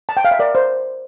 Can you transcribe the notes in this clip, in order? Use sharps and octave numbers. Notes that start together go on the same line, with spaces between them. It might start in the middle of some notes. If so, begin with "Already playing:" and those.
A5
G5
F5
E5
A#4 D5
C5